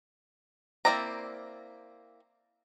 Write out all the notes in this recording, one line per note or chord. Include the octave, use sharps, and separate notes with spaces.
A#3 C4 E4 D5 A#5